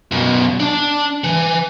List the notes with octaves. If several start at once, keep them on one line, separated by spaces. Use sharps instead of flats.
F#2 B2
D4 A5
E3